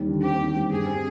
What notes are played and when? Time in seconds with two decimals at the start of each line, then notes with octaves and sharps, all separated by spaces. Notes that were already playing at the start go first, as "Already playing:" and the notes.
Already playing: D#2 G3
0.08 D3
0.23 C4 G4
0.39 D#2
0.55 G3
0.71 G2 G#4
0.86 C4